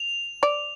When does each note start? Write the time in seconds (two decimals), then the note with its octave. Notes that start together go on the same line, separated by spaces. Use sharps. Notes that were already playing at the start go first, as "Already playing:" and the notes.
Already playing: F7
0.43 D5